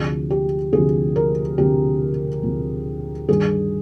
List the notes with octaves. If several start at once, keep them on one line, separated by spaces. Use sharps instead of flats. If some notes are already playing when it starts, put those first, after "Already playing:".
Already playing: D2 C3 F3 G#4
G4
D2 C3 F3 G#4
A#4
D2 C3 F3 G4
D2 C3 F3
G2 D#3 G3 G#4